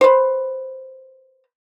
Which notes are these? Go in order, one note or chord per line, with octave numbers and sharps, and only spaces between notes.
B4 C5